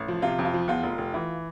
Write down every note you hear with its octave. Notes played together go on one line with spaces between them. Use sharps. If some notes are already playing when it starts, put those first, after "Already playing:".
Already playing: A1
F3
C3 F4
F2
F4
F3
E2 F4
F1
F1
E3